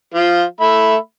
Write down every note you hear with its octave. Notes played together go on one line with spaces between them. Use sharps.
F3 F4
A3 E5 B5